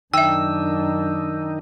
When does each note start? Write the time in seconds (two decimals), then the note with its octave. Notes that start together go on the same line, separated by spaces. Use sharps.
0.14 F#2 D#3 D4 D#4 E5 G5 E6